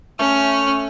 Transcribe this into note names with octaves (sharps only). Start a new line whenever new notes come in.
A3 C#4 F6